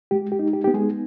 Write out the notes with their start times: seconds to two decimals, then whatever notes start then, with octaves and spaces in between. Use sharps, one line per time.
0.11 G#3 G4
0.32 G4
0.39 D#4
0.53 G4
0.64 B3 G4
0.74 G#3 G#4